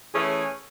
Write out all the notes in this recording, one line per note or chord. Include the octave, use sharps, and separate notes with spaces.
E3 A3 C#4 G#4